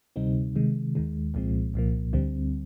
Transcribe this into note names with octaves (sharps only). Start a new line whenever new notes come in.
D2 C3 G3 C4 D#4
C3 D#3 G#3
D#2 D#3 G#3
C2 A#2 F3 G#3 C4
C2 A#2 F3 A#3
D2 D3 G3 C4